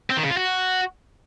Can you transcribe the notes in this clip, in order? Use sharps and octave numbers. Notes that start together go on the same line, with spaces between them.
C4
D#3
C#3
F4
F#4